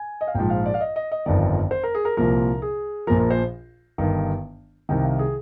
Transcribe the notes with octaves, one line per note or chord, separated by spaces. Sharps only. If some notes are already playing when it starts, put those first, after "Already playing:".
Already playing: G#5
D#5
F5
A#1 G#2 F3 G5
F5
D5
F5
D#5
D#5
D#5
G1 F2 D#3 D5
C5
A#4
G#4
A#4
C2 A#2 F3 A#4
G#4
A#1 A#2 F3 A#4
A#4
C5
G1 G2 D#3
C2 C3 D#3 G5
F5
G#4